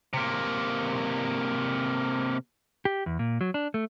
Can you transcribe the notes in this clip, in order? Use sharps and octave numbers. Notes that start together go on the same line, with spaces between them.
C3 A#3
G4
E2
A#2
F#3
D4
A3